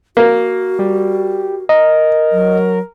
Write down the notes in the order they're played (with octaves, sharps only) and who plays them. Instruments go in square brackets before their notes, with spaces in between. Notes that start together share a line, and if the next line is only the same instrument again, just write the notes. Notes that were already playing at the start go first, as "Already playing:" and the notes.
[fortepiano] A#3 [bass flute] F#4
[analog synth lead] G3
[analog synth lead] A#4 [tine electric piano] D#5
[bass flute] F#3